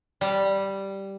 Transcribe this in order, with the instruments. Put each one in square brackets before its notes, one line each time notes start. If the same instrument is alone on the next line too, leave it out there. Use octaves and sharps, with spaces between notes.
[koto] G3